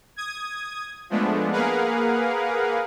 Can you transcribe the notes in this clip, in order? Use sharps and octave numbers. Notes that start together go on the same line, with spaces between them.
D#6 G#6
F3 G#3 A3 B3 D4
A#3 G#4 A#4 B4 F5 F#5